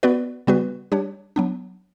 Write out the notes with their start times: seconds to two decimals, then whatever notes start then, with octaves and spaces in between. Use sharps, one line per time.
0.03 B3 F#4 B4 D5
0.47 C#3 G3 B3 F#4 B4
0.92 G3 D4 G4 C#5
1.36 F#3 B3 D4